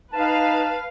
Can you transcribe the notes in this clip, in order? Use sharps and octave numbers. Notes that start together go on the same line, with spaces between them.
D#4 B4 F5 A5